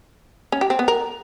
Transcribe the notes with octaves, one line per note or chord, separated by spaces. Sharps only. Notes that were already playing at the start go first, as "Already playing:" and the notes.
C#4
G4
C4
B3
A#4